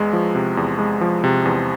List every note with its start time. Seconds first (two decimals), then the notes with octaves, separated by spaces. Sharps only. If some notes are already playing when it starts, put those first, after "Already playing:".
Already playing: E2 G#3
0.13 F3
0.35 C3
0.57 E2
0.79 G#3
1.01 F3
1.24 C3
1.45 E2